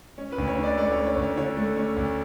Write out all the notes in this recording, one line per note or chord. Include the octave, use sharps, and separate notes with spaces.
C#4
B4
D2
C#5
D3
D5
A3 D5
C#5
C#4
C#5
D2
C#5
D3 C#5
A3
C#4
D2